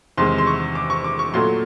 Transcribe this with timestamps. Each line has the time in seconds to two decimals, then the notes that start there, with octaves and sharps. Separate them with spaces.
0.17 E2 C3 D#3 G#3 C6
0.38 C6
0.47 C#6
0.75 D6
0.90 C#6
1.04 D6
1.19 C#6
1.34 A#2 F#3 A3 C6